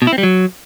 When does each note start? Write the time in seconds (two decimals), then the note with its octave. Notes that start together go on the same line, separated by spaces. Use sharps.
0.02 B2
0.07 E4
0.13 C4
0.18 G3
0.23 F#3